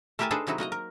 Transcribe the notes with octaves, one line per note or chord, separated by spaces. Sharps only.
A3 E4 G4 A#4 G#5 A5
D4 D#4 G#4 A4 B4 C5
C3 F#3 D#4 E4 F#4
A#3 F#4 D#5 A#5
A#4